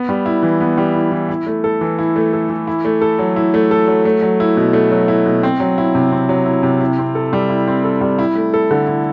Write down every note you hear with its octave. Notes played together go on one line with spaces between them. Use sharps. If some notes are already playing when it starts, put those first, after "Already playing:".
Already playing: B3
G3
E4
E3
B3
G3
E4
E3
E4
A3
A4
E3
E4
A3
A4
E3
E4
A3
A4
F#3
E4
A3
A4
F#3
A3
F#3
E4
B2
A3
F#3
E4
B2
C4
F#3
E4
C3
C4
F#3
E4
C3
E4
C4
A4
G3
E4
C4
A4
G3
E4
A3
A4
D3
E4